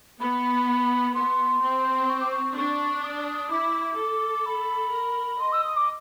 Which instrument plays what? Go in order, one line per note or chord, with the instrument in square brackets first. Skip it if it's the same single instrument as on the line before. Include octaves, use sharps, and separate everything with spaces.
[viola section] B3 [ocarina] B5
[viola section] B3 [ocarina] C6
[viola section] C4
[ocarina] C#6
D6
C#6
[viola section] D4 [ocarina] C#6
[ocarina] D#6
[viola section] E4 [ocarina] D6
[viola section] A4
[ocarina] B5
[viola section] A#4
[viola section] D#5 [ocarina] C6
[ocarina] E6
D#6
D6